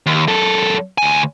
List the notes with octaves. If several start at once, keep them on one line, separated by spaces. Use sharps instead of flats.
D#2
F#2 A4
D2 G#5